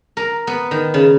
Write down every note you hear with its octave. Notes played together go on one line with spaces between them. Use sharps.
A#4
B3
D#3
C#3